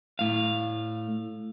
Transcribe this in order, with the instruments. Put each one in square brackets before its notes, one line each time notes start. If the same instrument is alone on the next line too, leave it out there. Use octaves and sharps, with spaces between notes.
[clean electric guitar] A2 F5